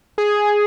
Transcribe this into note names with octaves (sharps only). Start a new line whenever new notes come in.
G#4